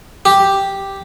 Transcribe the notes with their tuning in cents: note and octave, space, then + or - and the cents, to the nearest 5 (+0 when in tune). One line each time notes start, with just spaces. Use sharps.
G4 +0